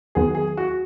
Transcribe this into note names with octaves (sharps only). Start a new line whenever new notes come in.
D#2 D#3 F#3 B3 G#4
G#4
F#4